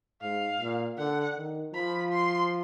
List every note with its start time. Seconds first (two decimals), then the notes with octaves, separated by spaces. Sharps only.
0.22 G#2 F5
0.60 A#2
0.98 D3 F#5
1.36 D#3
1.74 F3 B5
2.13 C6